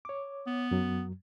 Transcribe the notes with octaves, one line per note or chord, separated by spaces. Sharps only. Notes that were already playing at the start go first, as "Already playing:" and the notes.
C#5 D6
B3
F#2 F#3